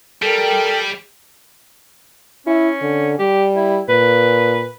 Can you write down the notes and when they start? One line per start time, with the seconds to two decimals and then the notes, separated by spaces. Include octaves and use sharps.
0.22 G3 A4 A#4 G5
2.46 C#4 E4
2.81 D3
3.19 G3 G4
3.56 E4
3.89 A#2 B4